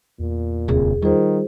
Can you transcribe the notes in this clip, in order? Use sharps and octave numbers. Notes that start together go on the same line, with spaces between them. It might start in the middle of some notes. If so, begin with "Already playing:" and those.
E2 A#2
D1 C3 G#4
D#3 G3 F4 G#4 C5